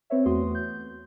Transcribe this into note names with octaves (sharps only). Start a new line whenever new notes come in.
C4 B4 C#5 E5
E2 A3 F#4 C6 D#6
G6